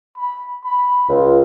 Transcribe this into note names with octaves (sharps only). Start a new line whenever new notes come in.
B5
B5
C#2 F4